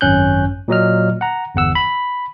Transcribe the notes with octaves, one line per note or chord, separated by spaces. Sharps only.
G#1 F#2 C#4 F#6 G6
A#2 F#3 D#5 F6
F#5 A#5
G1 E2 F#5 E6
B5